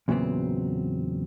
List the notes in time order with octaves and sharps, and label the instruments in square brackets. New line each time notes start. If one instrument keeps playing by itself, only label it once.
[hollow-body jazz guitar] E2 A#2 C#3 F#3 B3 C4